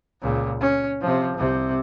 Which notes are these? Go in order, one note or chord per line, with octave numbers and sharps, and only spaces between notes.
C#2 A#2
C#4
C3 F3
C2 C3